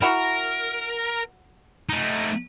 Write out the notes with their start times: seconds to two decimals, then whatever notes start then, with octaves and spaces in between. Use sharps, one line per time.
0.02 E4 F#4 A#4
1.89 A3 D#4